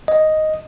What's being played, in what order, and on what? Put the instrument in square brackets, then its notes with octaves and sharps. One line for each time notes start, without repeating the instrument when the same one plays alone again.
[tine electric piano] D#5